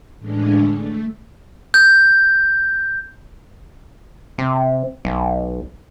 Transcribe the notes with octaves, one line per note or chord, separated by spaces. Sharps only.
A2 D3 E3 G#3 C#4 D4
A3
G6
C3
B1